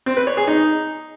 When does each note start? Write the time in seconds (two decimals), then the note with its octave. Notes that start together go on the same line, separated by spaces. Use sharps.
0.06 C4
0.17 B4
0.27 C#5
0.37 G#4
0.48 D#4